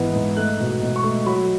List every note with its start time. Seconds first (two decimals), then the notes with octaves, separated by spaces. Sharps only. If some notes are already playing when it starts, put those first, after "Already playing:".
Already playing: G#2 E3 B3
0.15 G#2
0.37 A3 F#6
0.60 B2
0.81 B2
0.96 C#6
1.04 A3
1.26 F#3 B5